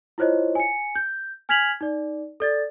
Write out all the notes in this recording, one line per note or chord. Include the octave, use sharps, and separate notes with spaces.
E4 F4 C5 C#5 D#5
G#5 C#7
G6
G#5 F6 G#6 B6 F7 F#7
D#4 D5
A4 D5 A6